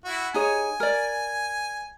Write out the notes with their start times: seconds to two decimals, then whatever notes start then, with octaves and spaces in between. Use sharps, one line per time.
0.05 E4 F#4
0.34 D#4 G#4 C#5 G#5
0.80 A#4 D5